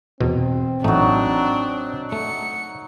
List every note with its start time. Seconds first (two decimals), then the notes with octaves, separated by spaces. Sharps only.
0.21 E2 B2 C4
0.84 A1 F#3 A3 D4 D#4
2.12 A3 C#7